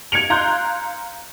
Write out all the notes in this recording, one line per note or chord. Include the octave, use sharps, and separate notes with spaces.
G#6 C#7 D7 F7
F5 A#5 C6 F#6 G6